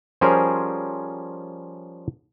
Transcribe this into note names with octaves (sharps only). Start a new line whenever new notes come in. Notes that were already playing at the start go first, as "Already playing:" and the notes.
F3 G3 C#4 G#4 A#4 C5